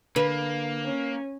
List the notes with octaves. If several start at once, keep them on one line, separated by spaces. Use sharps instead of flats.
D3 A#3 B4
C#4